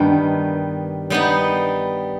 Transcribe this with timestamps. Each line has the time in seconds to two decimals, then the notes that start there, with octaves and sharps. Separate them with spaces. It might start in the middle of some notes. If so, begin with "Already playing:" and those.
Already playing: G2 D#3 G3 B3 D#4
1.10 G3 B3 D#4